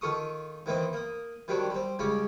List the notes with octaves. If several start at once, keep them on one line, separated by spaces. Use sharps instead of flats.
D#3 F4 A4 C#6 D#6
D#3 E3 A#3 C4 D#4
A#3 D#6
D#3 F#3 G3 C4 D4
G3 C4
C#2 G3 C#4 D5